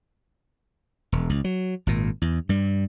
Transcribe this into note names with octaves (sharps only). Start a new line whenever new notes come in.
E1
C#2
F#3
G#1 A#2
E2
G2 G3